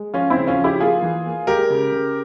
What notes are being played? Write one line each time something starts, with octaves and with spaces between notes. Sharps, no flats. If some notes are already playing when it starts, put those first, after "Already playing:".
Already playing: G#3
F3 C#4 F4
C4 E4
C#3
C#4 F4
F3
E4 G4
A#3 F4 G#4
E3
A#3
G#3 G4 A#4
C#3
C#3